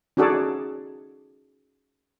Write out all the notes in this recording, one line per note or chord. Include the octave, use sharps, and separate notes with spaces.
C#4 D#4 F#4 G#4 A4 D5